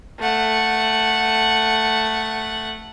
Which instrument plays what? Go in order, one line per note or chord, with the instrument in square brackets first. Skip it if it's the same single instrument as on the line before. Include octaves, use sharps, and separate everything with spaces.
[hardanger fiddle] A3 F#5